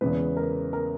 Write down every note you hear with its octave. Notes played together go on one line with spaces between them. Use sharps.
E2 C#3 E3 G#3 B4
A#4
A#4